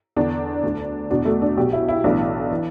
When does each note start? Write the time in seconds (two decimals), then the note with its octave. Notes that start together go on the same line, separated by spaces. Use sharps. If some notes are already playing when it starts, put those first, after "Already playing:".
0.16 E2 D3 D4
0.63 D2 D3
1.10 E2 B2 D4
1.25 A3
1.42 D4
1.57 B1 B2 G4
1.73 E4
1.89 E4
2.04 B1 A2 E3 D4
2.51 E3